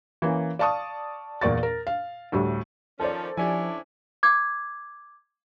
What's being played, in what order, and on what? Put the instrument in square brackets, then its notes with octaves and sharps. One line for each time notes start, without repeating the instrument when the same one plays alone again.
[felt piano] E3 A#3 C#4
D5 F5 A5 C#6 D#6
E2 A#2 A#4 D5 C#6 A6
A#4
F5
D2 A2 G3
[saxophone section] D#3 F3 C#4 [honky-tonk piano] A4 C5 D5
[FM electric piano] F3 G4 [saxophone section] C#4 D4 E4 [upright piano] G#5
[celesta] D6 G#6